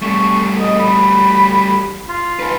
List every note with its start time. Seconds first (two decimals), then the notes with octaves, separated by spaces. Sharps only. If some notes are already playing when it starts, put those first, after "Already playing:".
0.02 G3 A3 C#6
0.60 D#5
0.80 B5
2.09 F4
2.40 D#4 B4